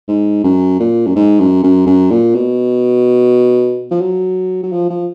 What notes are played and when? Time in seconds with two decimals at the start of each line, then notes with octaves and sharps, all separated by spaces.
0.08 G#2
0.44 F#2
0.80 A#2
1.07 F#2
1.16 G#2
1.40 F#2
1.64 F#2
1.87 F#2
2.11 A#2
2.35 B2
3.91 F3
4.01 F#3
4.63 F#3
4.72 F3
4.90 F3